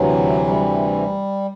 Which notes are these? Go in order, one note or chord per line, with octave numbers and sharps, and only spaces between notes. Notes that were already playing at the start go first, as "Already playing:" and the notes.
Already playing: D2 C3 E3 F#3
G3